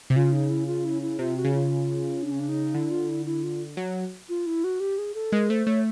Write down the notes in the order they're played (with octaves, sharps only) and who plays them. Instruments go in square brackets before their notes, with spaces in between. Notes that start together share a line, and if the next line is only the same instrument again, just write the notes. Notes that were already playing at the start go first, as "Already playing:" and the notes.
[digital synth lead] C3
[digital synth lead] C#3 [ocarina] F4
[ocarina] D#4
E4
F4
E4
E4
[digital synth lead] C3 [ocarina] F4
[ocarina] F#4
[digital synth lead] C#3
[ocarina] F4
D4
C#4
D4
D#4
[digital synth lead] D3 [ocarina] E4
[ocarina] F4
E4
E4
F4
[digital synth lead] F#3
[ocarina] F4
E4
F#4
G4
G#4
A4
[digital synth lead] G#3 [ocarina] A#4
[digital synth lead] A3 [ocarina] C5
[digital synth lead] A3 [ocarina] C#5